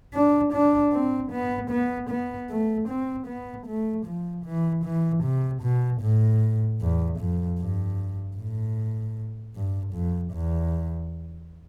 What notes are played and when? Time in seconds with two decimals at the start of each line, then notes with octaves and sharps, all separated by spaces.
0.14 D4
0.53 D4
0.93 C4
1.32 B3
1.71 B3
2.10 B3
2.49 A3
2.89 C4
3.27 B3
3.67 A3
4.06 F3
4.45 E3
4.85 E3
5.24 C3
5.63 B2
6.02 A2
6.81 E2
7.19 F2
7.59 G2
8.37 A2
9.55 G2
9.94 F2
10.33 E2